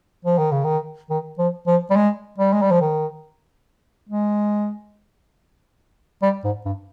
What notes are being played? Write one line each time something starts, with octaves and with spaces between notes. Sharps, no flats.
F3
D#3
C#3
D#3
D#3
F3
F3
G3
G#3
G3
G#3
G3
F3
D#3
G#3
G3
G#2
G2